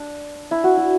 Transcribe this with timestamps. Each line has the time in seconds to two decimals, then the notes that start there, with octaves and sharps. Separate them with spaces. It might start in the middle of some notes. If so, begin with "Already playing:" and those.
Already playing: D4
0.51 E4
0.64 F#4
0.77 E4